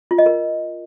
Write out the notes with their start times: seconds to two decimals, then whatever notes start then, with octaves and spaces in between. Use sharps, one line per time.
0.11 F4
0.18 D#5
0.26 A#4